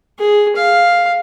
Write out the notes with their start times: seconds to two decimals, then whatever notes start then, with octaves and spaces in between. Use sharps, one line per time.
0.19 G#4
0.56 F5